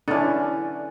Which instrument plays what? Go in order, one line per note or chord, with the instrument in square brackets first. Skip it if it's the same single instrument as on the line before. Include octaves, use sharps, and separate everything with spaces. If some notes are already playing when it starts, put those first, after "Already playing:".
[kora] D3 E3 [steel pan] C#4 D4